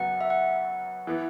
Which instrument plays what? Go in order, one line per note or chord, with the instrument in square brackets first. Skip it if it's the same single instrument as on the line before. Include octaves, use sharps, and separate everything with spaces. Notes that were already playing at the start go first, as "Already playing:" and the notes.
Already playing: [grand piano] F#2 C#3 F#3 B3 F#4 [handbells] F#5
[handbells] E5
F#5
[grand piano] E3 B3